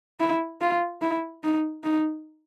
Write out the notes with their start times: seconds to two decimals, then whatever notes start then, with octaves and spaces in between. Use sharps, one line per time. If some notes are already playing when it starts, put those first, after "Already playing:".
0.20 E4
0.61 F4
1.02 E4
1.44 D#4
1.84 D#4